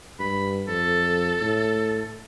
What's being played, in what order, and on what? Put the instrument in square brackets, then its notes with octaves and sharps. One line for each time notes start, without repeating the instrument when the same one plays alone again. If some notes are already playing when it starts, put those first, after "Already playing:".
[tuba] G2 [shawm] B5
[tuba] F2 [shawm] A4
[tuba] A2